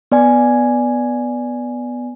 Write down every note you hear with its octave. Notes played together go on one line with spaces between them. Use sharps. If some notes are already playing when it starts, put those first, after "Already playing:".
B3 D5 G#5